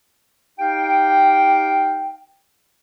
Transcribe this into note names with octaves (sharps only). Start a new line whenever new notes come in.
D#4 G4 F5 G5